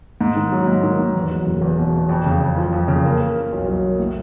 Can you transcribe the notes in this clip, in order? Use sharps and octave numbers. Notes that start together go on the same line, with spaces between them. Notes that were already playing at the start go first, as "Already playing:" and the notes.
G#2
D#3
F#3
G#2
D#3
G#2
E2
F#3
F#1
E2
B2
E2
F2
C#3
F2
F3
F2
C#3
A#3
A#3
A#3
B1
F#3
A#3
A2